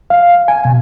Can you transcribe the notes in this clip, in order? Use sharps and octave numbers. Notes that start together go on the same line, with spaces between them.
F5
G#5
B2